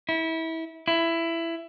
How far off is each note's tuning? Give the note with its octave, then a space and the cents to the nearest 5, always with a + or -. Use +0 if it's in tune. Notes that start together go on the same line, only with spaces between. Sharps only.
E4 -25
E4 +15